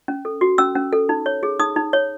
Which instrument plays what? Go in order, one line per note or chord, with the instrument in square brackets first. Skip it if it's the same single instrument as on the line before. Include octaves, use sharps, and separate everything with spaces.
[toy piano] C#4
A4
F#4
C#4 E6
C#4
A4
D#4
C#5
G#4
D#4 D#6
D#4
C#5